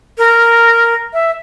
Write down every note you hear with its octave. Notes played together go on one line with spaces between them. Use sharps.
A#4
E5